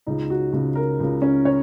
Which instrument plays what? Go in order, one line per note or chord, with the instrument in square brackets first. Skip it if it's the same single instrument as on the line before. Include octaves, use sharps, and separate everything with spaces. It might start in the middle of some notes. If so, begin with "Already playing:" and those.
[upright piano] C#2 C#3 D#4
F#4
C#2 C#3 F#4
A#4
C#2 C#3
C#4
C#5